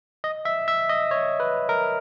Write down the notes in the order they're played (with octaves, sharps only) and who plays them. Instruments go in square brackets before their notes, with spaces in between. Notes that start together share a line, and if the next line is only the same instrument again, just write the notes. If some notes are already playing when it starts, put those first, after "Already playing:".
[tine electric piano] D#5
E5
E5
D#5
C#5
B4
A#4